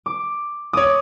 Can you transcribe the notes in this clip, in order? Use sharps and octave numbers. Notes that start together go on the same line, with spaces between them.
D6
C#5 D6 D#6